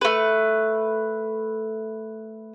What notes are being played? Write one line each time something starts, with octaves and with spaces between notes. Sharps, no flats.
A3 B4